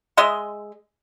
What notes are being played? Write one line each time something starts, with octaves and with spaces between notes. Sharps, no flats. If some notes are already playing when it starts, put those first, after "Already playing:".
G#3 D#5 E5 C6